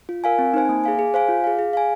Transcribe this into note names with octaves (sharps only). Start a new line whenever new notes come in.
F4
A#4 F5 G#5
C4
D#4 C5 G#5
A#3
G#4 F5 G#5
G#4
C5 F5 G#5
F4
G#4 F5
G#4
F5 G#5